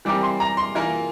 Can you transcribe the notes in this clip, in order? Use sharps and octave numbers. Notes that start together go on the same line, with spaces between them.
E3 G3 C4 G4 A#4 D6
C6
A#5
C6
E3 A#3 F4 A#4